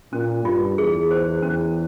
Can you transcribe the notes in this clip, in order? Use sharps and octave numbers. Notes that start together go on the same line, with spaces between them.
A#2 C#4
G2 F4
E2 G#4
C5
E2 C#4